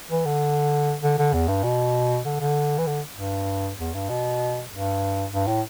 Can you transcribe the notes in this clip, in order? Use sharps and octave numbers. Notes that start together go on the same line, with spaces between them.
E3
D3
D3
D3
E2
G2
B2
D3
D3
E3
D3
G2
E2
G2
B2
G2
G2
A2